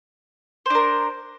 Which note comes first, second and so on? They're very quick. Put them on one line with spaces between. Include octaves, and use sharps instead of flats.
C5 D4 A#4